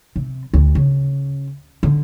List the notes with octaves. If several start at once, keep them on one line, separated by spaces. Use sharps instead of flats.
C3
D2
C#3
D3